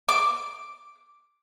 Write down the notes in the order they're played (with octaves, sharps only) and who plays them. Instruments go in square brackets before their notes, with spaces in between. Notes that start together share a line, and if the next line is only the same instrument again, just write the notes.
[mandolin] D6